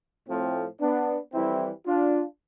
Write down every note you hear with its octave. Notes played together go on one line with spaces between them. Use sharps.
A2 F3 A3 C4
B3 D4
F2 E3 G3 C4 E4
D4 F4